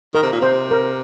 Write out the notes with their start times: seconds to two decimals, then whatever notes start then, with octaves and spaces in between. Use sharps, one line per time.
0.15 D#3 A#4
0.23 C3
0.32 A#2
0.41 C3 C5
0.71 A#4